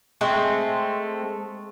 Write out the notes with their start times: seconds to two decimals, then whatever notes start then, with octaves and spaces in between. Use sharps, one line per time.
0.21 G#3 A3 C4